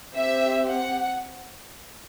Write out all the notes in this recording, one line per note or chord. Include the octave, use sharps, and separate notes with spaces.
C4 G4 E5
F#5